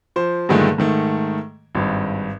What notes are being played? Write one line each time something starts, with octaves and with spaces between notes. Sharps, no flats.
F3 C5
G2 A#2 D3 D#3 G#3 A3
G#2 D#3 A3
G#1 G2